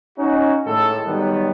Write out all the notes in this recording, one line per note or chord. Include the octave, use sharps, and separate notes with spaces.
C#4 D#4 F#4
A2 D#3 G#3 A4
D#3 F#3 G3 B3